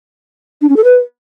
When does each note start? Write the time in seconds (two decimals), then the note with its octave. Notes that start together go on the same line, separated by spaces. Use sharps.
0.62 D4
0.69 C#4
0.77 A4
0.84 B4